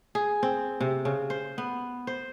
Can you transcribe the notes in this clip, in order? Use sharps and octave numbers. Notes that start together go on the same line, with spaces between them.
G#4
C4
C3
C#3
C5
B3
C5